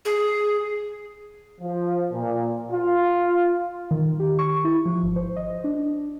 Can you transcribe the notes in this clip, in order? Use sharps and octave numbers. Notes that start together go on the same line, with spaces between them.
G#4
F3
A#2
F4
D#3
G4
C#6
E4
F3
G#1
C5
D#5
D4